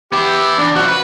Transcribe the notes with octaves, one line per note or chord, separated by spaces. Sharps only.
B3 E4 G4
E2 D4
F#2 F3 F#4
B4